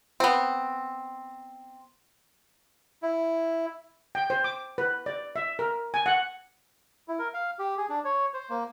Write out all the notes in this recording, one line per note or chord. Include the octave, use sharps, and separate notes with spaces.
B3 C4
E4
G5
C5
D6
B4
D5
E5
A#4
G#5
F#5
E4
A#4
F5
G4
G#4
D4
C#5
C5
A#3